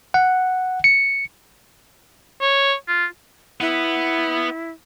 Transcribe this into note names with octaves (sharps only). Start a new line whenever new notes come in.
F#5
C#7
C#5
F4
B3 E4 B4